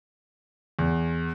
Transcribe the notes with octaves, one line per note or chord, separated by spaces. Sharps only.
E2